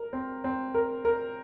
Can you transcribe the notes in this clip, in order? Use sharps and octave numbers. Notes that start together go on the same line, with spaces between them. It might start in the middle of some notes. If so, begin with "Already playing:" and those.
Already playing: A#4
C4
C4
A#4
A#4